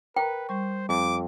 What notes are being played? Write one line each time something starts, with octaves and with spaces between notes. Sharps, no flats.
A#4 B4 G5 A#5
G3 C5 C#6
F2 D6